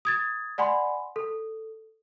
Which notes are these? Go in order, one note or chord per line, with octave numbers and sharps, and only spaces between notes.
D#6 G#6 A6
D5 F#5 G#5 B5 C6
A4